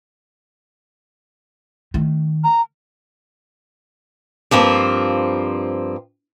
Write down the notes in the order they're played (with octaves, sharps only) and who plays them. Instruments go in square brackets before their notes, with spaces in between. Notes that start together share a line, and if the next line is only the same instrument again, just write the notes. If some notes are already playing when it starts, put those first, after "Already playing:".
[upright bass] D#3 A3
[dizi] A#5
[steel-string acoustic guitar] G2 F3 A#3 C4